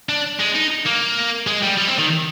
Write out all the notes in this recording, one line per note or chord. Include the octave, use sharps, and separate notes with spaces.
D4
G#3
D#4
A#3
G#3
G3
G3
C4
D#3